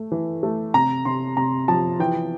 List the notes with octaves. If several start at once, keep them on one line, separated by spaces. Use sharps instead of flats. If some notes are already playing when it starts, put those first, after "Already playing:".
Already playing: A3
E3
A3
C3 A#5
C3 C6
C3 A#5
F3 A5
E3 G5